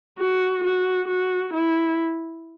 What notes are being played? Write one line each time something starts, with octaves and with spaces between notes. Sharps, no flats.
F#4
F#4
F#4
E4